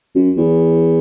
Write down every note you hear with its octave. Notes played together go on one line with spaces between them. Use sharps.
F#2
E2